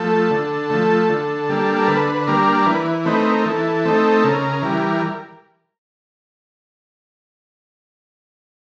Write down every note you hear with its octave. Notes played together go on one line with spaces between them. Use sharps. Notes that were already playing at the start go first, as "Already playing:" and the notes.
Already playing: F3 A3 A4
D3
F3 A3
D3
G3 A#3 D4
A#4
D3 B4
B4
G3 A#3 D4 A#4
E3 B4
A3 C4 D#4 B4
A#4
E3 A4
A3 C4 D#4
C#3 A#4
E3 G3